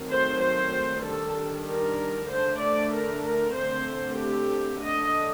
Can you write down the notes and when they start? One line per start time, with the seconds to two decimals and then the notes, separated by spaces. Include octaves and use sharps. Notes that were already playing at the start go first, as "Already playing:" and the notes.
Already playing: D#3 F#3 A3 C4
0.10 C5
0.41 C5
1.03 D#3 G3 D4 A4
1.67 A#4
2.29 D3 A3 D4 C5
2.61 D5
2.93 A#4
3.24 A#4
3.55 D3 A3 C4 C5
4.18 G4
4.81 D3 A3 D4 D#5